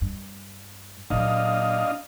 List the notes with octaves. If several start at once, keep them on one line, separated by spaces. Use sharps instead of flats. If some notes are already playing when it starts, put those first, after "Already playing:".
G2
A#2 F#3 D4 D#5 F5